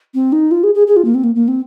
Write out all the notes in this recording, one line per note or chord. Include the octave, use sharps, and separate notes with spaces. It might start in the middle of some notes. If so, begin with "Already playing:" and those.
C4
D#4
F4
G#4
G#4
G#4
F4
A#3
C4
A#3
A#3
C4